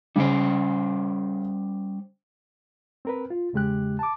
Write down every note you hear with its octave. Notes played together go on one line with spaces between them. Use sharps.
C#3 G3 C#4 C5
C4 A#4 B4
F4
E2 C#3 G#3 G4 F#6
A5 D6